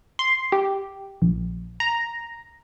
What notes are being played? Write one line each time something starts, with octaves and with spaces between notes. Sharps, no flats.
C6
G4
A#1
A#5